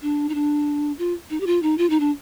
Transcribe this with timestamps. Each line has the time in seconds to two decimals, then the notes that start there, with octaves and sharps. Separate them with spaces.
0.02 D4
0.29 D#4
0.35 D4
0.99 F4
1.30 D#4
1.40 G4
1.47 F4
1.63 D#4
1.78 F4
1.90 D#4
2.00 D4